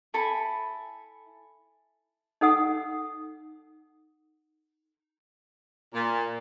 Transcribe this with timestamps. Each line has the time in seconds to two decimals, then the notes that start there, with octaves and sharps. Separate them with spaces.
0.14 E4 A4 G#5 B5
2.41 D#4 A4 F#5 D#6
5.94 A#2